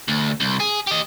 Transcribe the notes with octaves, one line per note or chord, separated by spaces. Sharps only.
D2
C2
G#4
G4 D#5